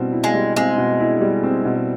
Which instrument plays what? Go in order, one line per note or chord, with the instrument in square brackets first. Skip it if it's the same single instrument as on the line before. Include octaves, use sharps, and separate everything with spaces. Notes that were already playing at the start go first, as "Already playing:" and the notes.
Already playing: [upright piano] B2 G3 C4 E4
E4
[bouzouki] G#3
[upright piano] G3
[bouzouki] G#3 [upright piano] C4
[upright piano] B2
E4
G3
C4
B2